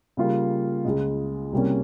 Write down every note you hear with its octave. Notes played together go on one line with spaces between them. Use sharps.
C#3 G3 A#3 F4
C#2 C#3 G#3
C2 C3 G3 A#3 C#4